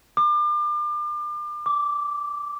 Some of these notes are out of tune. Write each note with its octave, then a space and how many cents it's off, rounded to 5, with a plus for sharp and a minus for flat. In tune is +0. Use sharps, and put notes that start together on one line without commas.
D6 +35
D6 -10